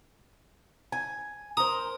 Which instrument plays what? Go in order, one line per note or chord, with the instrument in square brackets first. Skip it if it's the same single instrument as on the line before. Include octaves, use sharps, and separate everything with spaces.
[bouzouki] G#5
[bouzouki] A#4 C5 [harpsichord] D#6